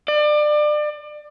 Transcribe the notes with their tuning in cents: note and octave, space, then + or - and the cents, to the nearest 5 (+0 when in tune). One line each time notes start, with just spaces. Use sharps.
D5 +30